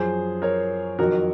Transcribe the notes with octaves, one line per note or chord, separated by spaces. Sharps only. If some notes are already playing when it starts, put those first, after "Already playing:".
Already playing: F#2 F3 G#4 C5
A#4 C#5
F2 D#3 F#3 F#4 A#4